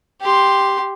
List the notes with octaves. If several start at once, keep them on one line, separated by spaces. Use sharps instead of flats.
G4 C6